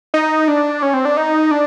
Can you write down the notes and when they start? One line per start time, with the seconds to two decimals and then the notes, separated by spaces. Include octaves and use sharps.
0.14 D#4
0.48 D4
0.82 C#4
0.94 C4
1.05 D4
1.17 D#4
1.51 D4